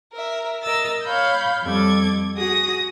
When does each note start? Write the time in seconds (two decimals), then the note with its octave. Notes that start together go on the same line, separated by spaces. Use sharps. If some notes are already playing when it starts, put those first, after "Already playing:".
0.12 A#4 E5
0.63 A#4 D#5 E6 A6
1.04 C#5 F5 B5 G6
1.64 F2 G3 A4 D6 G#6
2.37 F#4 G#4 D#6 A#6